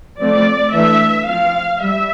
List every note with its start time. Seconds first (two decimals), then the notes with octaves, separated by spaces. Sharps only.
0.20 F3 A3 C4 D5
0.73 E3 A3 D4 E5
1.28 F3 C4 F5
1.81 G3 E5